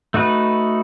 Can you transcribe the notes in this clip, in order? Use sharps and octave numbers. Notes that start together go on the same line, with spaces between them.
A3 D#4 F#4 B4